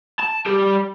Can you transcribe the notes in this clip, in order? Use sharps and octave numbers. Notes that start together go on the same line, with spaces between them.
A5
G3 G4